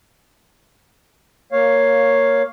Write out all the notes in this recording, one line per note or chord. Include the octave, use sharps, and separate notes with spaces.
A#3 C#5 F5